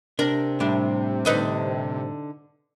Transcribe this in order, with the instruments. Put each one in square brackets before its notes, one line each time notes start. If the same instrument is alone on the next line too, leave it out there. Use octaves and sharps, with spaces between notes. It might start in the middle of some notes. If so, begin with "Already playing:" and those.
[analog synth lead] C3 [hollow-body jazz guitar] D4 [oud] A#4
[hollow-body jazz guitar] A2 G3 D4
[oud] D3 D#4 B4